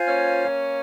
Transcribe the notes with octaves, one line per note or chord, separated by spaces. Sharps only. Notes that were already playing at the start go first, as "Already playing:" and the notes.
Already playing: F4 C5 F5 G#5
A#3 C#4